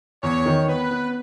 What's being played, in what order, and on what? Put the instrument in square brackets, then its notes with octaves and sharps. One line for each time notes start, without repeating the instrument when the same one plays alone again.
[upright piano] E2 [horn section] C#5
[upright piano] D#3
[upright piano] B3 [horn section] B4
[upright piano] B3